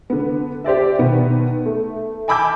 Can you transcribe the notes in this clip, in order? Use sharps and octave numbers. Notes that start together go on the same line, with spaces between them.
D3 B3
G4 C5 D5 E5
B2 D#3 B3
A3
G#5 A5 B5 D6 E6 G6